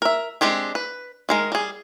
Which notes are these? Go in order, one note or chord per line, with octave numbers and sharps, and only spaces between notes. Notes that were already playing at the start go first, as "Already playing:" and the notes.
A#4 E5
G#3 C4 D4 G4 G#4
B4
D#3 G#3 A#4
G3 G#4